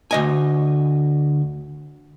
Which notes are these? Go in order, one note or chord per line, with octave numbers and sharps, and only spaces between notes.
D2 D#5 G#5